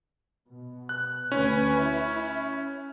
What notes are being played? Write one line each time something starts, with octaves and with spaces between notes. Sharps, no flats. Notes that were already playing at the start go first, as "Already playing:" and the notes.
B2
F#6
D2 C#4 B4 G#5
E4